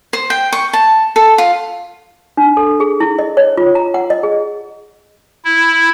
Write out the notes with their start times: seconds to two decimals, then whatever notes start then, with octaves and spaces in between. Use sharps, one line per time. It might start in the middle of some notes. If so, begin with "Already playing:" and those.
0.13 C5
0.30 G5
0.52 C#6
0.73 A5
1.16 A4
1.38 F4
2.37 D4
2.57 A4
2.80 G#4
3.00 E4
3.19 D#5
3.37 C#5
3.57 F4
3.75 A#5
3.94 F#5
4.10 D#5
4.23 G#4
5.45 E4